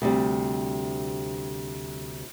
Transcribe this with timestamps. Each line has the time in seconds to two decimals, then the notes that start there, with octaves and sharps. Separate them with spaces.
0.02 D2 C3 G3